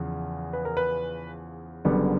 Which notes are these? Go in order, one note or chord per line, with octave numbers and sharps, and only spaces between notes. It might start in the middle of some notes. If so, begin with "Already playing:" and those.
Already playing: E2 C#3 F3
B4
A#4
B4
F#1 F#2 D3 G3 B3